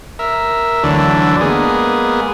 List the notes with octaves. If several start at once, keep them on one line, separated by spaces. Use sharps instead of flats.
A#4 E5
D2 D3 E3 F#3 D4
G#3 A#3 B3 G#4